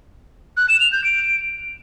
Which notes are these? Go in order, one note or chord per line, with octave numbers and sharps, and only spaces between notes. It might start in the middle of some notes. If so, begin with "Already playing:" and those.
F#6
E7
F7
G6
D7